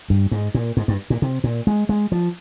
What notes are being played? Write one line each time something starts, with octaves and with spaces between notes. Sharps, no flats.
G2
G#2
A#2
G#2
G2
A#2
C3
A#2
G#3
G#3
F3